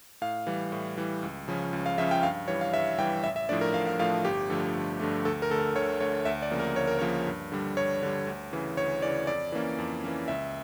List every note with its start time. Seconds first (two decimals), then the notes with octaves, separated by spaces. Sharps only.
0.21 A2 F5
0.47 E3 G3
0.72 A2
0.98 E3 G3
1.23 C#2
1.48 C#3 F3 C#4
1.73 C#2
1.86 F5
1.98 C#3 F3 C#4 E5
2.11 G5
2.23 G2 F5
2.48 E3 G3 C#5
2.61 F5
2.74 G2 E5
2.98 E3 G3 G5
3.24 A1 E5
3.36 E5
3.49 A2 F3 A3 D4 D5
3.61 A#4
3.74 A1 F5
3.87 F5
3.99 A2 F3 A3 D4 F5
4.24 G1 G4
4.50 G2 D3 F3 A3
4.75 G1
4.99 G2 D3 F3 A3
5.25 D2 A4
5.42 A#4
5.50 D3 A3 A4
5.59 A#4
5.75 D2 C#5
6.00 D3 A3 C#5
6.25 D2 E5
6.42 D5
6.51 C#3 F3 A#3
6.60 A#4
6.76 D2 C#5
6.87 A#4
6.99 C#3 F3 A#3 C#5
7.27 G2
7.52 D3 G3
7.77 G2 C#5
8.02 D3 G3
8.27 D2
8.53 C#3 E3
8.77 D2 C#5
9.02 C#3 E3 D5
9.27 F2 D5
9.52 E3 A#3 C#4
9.78 F2
10.04 E3 A#3 C#4
10.28 C#2 E5